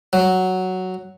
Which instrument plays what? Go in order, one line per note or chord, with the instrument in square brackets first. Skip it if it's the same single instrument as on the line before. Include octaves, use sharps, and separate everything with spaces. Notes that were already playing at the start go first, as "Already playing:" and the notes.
[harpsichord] F#3